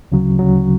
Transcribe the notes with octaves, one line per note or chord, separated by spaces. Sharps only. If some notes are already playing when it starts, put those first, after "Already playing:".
D2 C#3 F#3
D2 C#3 F#3